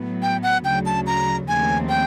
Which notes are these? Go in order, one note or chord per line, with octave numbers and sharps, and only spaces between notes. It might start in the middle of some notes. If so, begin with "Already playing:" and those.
Already playing: A2 F#3 B3
G5
F#5
D2 C#3 F#3 G5
A5
A#5
D#2 C#3 F3 A3 C4 G#5
G5